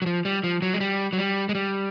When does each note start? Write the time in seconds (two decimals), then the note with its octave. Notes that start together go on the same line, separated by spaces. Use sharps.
0.02 F#3
0.06 F3
0.25 G3
0.44 F3
0.62 F#3
0.74 G#3
0.80 G3
1.13 F#3
1.18 G3
1.49 G#3
1.55 G3